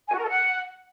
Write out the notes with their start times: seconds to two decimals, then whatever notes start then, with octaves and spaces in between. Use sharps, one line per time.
0.08 G#5
0.13 F#4
0.18 A#4
0.23 A4
0.28 F#5